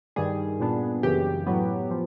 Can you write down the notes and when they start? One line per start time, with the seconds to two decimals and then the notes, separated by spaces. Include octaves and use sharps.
0.16 G2 D#3 G3 G#4
0.60 A#2 G3 B3 D4
1.03 F#2 C#3 E3 G4
1.47 A2 F#3 B3
1.91 F3